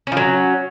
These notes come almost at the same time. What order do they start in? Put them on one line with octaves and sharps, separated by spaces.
C#4 F3 F#3